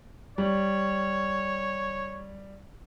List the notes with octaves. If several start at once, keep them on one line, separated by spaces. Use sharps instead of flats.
G3 C#5